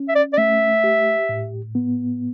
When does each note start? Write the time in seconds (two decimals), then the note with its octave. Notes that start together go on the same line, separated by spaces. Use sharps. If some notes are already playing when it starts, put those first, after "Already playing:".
Already playing: C#4
0.09 E5
0.15 D5
0.33 D5
0.38 A3 E5
0.84 G4
1.29 A2
1.75 B3